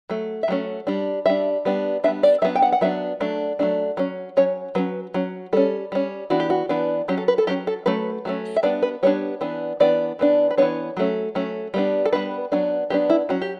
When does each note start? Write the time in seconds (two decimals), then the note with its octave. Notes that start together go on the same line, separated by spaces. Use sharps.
0.10 F#3 A3
0.43 E5
0.48 F#3 A3 C#4
0.87 G3 D4
1.26 G3 D4 E5
1.65 G3 B3 D4
2.04 G3 B3 D4 E5
2.23 D5
2.42 F#3 E5
2.45 B3 D4
2.56 G5
2.62 F#5
2.72 F#5
2.81 F#3 B3 D4 E5
3.20 F#3 A3 D4
3.59 F#3 A3 D4
3.97 F#3 C#4
4.37 F#3 C#4 C#5
4.75 F#3 C#4 B4
5.14 F#3 C#4
5.53 G3 C#4 A4
5.92 G3 C#4
6.30 E3 B3 D4 F#4
6.40 G4
6.50 F#4
6.69 E3 B3 D4
7.08 F#3 C#4 G4
7.18 A4
7.28 B4
7.38 A4
7.47 F#3 C#4 G4
7.67 A4
7.86 F#3 A3 C#4 B4
8.25 F#3 A3 C#4
8.57 E5
8.63 G3 B3 D4 D5
8.83 B4
9.03 G3 B3 D4 C#5
9.41 E3 B3 D4
9.80 E3 B3 D4 D5
10.19 E3 B3 D4
10.51 B4
10.58 E3 B3 D4 C#5
10.97 F#3 A3 C#4
11.35 F#3 A3 C#4
11.74 G3 B3 D4
12.06 A4
12.13 G3 B3 D4 B4
12.52 F#3 B3 D4
12.90 F#3 B3 D4 G4
13.10 E4
13.29 F#3 C#4 F#4
13.42 G4